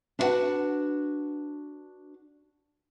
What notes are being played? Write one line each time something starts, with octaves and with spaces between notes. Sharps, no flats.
D4 E4 F#4 B4 F#5 A5